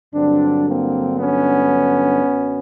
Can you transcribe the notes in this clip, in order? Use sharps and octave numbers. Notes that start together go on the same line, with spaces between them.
G2 D3 F#3 C4 D4
A#3 C4
B3 C#4
F#2 D3 F#3